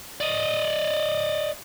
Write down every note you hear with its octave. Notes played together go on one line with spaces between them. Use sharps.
D5 D#5